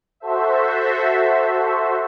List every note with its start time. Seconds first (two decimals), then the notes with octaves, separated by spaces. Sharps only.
0.20 F#4 A4 C5 E5